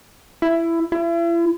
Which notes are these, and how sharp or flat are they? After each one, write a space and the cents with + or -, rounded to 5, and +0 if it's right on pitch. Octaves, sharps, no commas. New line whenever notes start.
E4 +15
E4 +40